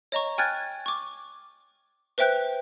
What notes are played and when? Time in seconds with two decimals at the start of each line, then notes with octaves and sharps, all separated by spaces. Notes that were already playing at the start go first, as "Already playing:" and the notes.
0.12 C#5 D#5 A#5 C#6
0.38 G5 G#5 F6 F#6 G#6 A6
0.86 C#6 D6
2.18 B4 C5 E5 G5 F#6 G6